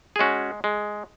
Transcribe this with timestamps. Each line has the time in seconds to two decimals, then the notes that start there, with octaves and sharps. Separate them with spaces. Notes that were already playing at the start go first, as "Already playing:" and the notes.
0.16 G#4
0.19 G#3 C#4 F#4
0.64 G#3